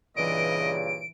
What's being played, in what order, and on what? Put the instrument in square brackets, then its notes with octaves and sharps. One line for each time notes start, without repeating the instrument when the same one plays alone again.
[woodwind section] G2 A#2 C#3 [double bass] E3 [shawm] D#5 [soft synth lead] D7